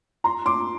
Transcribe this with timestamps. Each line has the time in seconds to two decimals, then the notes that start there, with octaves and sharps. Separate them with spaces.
0.24 A#5 C6
0.46 C6 D6